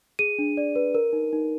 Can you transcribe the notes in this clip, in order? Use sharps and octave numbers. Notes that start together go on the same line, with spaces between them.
G#4 D#7
D4
D5
B4
A#4
D#4
D#4